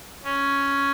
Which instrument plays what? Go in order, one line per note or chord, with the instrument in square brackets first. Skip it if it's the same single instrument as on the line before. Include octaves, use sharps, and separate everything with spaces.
[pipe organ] C#4